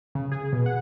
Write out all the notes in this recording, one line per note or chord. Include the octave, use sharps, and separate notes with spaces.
C#3
G#4
B2
F#5